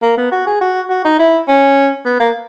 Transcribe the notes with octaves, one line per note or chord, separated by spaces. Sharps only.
A#3
B3
F#4
G#4
F#4
F#4
D#4
E4
C#4
B3
A#3